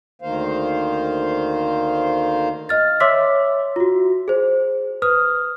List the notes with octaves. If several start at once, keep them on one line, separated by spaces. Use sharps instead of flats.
D2 D#3 A#3 C5 F5
D#5 F6 A6
C#5 E5 C6 D6 E6 B6
F4 F#4
G#4 C5
B4 D#6 F6